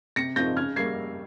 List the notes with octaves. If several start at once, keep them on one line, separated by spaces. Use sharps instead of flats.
C3 A#6 C#7
F3 C4 D#4 G6 A#6
C#3 F6 G#6
G3 A#3 G#6 C7